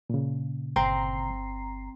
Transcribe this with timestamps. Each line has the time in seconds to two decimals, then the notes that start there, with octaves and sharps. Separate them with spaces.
0.10 A#2 C#3
0.76 G1 C4 A#5 C7